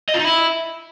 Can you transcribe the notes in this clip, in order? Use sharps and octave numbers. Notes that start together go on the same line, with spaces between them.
D#5
F4
D#4
E4